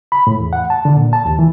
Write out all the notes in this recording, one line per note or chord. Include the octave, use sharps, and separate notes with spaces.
B5
A2
E2
F#5
A5
D3
A#2
A5
D#2
E3